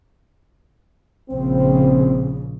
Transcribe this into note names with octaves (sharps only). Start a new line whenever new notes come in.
A#1 C#3 C4